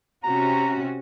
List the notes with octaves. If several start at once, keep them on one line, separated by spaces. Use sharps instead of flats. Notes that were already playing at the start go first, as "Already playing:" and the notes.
C3 C#4 F#4 A#5